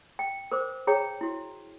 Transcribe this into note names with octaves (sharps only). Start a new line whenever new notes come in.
G5
A#4 C5 D6
G#4 C#5 G5 A#5
E4 F#4